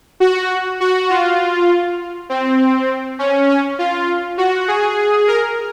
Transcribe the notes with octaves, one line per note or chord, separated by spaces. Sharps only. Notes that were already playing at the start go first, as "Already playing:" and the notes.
F#4
F#4
F4
C4
C#4
C#4
F4
F#4
G#4
A#4